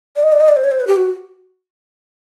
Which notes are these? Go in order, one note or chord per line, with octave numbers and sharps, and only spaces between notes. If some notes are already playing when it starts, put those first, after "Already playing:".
D5
D#5
D5
D#5
D5
C5
C#5
C5
B4
G4
F#4